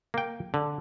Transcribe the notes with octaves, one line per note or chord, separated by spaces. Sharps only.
A#3 G5
D3